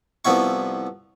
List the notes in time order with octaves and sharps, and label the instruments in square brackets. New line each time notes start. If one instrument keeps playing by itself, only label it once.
[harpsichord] C2 F3 B3 E4 C#6